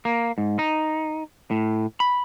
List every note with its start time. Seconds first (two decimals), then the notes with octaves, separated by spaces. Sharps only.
0.05 A#3
0.38 G#2
0.59 D#4
1.51 A2
2.00 B5